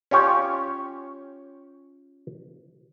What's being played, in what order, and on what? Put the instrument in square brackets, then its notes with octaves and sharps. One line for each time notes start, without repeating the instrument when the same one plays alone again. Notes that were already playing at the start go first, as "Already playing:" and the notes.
[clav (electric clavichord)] C#4 F4 G4 C#5